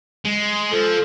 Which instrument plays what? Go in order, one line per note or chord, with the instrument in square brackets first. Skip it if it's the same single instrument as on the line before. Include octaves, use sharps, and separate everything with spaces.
[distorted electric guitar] G#3
[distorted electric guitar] F3 [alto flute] A4